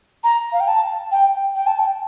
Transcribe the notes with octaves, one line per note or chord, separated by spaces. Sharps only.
A#5
F5
G5
A5
G5
G5
A5
G5